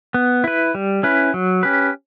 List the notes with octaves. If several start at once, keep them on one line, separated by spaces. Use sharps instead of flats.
B3
E4 B4
G3
C#4 E4 B4
F#3
C#4 G4 B4